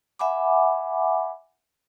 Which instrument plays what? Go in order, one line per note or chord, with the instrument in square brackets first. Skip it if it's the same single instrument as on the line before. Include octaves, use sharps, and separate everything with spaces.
[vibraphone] E5 F#5 G#5 B5 D6